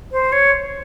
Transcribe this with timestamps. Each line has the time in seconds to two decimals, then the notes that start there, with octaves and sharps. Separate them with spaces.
0.12 C5
0.33 C#5